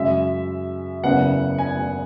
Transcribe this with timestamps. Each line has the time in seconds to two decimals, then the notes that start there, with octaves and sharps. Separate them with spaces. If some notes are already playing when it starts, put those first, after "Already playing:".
Already playing: F#2 C#3 G#3 E5
1.03 F#1 E2 C#3 F#5
1.58 G#5